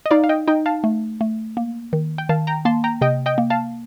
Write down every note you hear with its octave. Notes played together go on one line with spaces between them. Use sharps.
D#5
D#4 D5 F5
F5
D#5 G5
D#4 D#5 G5
F5 A5
A3
A3
A#3
D#3
G5
D#3 F5 A5
G5 A#5
A#3 A5 C6
G5 A#5
C3 D#5 G5
D#5 G5
A#3
F5 A5